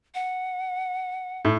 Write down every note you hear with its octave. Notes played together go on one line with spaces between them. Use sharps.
F#5
A2